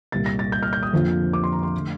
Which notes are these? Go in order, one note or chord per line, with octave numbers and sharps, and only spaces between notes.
C2 A#2 G3 A#3 A6
A#6
A6
G6
F6
G6
D#6
F2 D3 F3 A#3 F4
D6
C6
A#5
C6
D3 A3